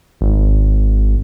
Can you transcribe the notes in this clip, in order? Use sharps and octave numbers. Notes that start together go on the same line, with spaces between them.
G#1